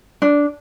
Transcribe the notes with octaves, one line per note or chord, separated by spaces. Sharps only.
D4